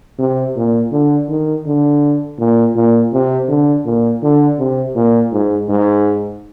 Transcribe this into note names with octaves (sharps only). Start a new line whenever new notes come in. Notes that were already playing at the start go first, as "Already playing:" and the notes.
C3
A#2
D3
D#3
D3
A#2
A#2
C3
D3
A#2
D3
C3
A#2
G#2
G#2